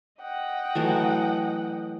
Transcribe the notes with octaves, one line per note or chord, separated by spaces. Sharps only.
D#5 F#5 G5
E3 F#3 A3